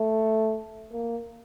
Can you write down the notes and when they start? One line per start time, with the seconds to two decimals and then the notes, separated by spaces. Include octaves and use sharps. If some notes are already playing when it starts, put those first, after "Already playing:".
Already playing: A3
0.92 A#3